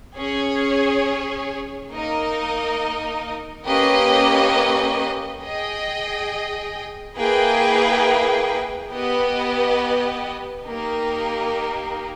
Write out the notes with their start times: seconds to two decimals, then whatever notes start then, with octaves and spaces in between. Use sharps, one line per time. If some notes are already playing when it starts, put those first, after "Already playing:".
0.16 C#4 G#4 C#5
1.91 A#3 D#4 A#4 D#5
3.66 A#3 C#4 G4 B4 D#5
5.42 G#4 D#5 G5
7.17 A#3 E4 G#4 B4 G5
8.91 B3 G4 B4 D#5
10.67 A#3 D#4 G4 A#4